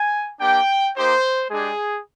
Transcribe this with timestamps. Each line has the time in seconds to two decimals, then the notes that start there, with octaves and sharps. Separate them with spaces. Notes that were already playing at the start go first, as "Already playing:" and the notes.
Already playing: G#5
0.40 A#3 D4 G4 G5
0.96 A#3 D#4 G4 C5
1.51 G#3 D4 G4 G#4